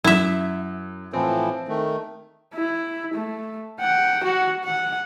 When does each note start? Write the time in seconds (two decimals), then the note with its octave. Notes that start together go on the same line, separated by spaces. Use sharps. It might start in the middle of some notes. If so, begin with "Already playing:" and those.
0.04 F#2 E4 E5
1.13 A2 E3 F3 C4
1.68 D#3 A3
2.54 E4
3.14 A3
3.80 F#5 G5
4.23 F#4 F#5
4.64 F#5